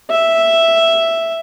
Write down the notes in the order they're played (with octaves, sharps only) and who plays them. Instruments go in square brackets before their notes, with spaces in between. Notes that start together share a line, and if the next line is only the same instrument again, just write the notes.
[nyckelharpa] E5